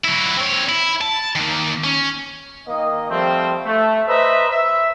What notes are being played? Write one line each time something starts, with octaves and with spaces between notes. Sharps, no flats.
F#3 E4
C4 C#5
E4
A5
D#3 A#3
C#4
D#3 A#3 D#5
F3 G3 A3 C4 C5
A3
B4 C5 D#5 E5 A#5
E5